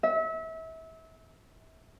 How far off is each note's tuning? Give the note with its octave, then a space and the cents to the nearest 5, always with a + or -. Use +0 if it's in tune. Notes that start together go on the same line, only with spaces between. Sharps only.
E5 -30